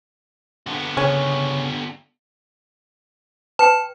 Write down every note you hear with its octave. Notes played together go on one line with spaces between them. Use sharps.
D3 B3
C#3 C#4
B4 G5 A5